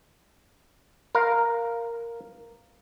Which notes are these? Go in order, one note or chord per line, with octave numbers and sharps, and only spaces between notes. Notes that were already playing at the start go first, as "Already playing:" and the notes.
A#4 F5